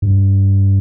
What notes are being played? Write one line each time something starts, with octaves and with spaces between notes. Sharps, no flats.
G2